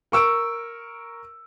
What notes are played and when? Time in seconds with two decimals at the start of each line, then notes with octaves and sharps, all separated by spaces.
0.12 A#4 C#6 E6 D7